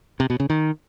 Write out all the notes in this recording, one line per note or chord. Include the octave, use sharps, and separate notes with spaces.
C3
B2
C#3
D#3